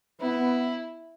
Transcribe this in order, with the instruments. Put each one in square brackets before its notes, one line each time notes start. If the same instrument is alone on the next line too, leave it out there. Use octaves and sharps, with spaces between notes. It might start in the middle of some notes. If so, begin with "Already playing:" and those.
[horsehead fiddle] B3 [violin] E4